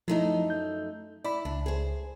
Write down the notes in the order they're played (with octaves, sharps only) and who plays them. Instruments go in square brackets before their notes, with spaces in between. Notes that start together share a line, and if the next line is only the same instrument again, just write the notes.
[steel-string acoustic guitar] F#2 A3 D#4 [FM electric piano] F3 E4
[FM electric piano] G6
[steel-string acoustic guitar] E4 [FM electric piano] D5 B5
[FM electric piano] C#2 [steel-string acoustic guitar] D4
[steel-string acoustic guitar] G#4 C5